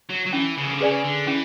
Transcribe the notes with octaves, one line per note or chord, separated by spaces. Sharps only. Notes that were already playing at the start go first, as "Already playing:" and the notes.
F#3
F#3
E3 C#4
C#3
E3
D3
C#3 G#4 B4 D5 G#5
D3
E3 C#4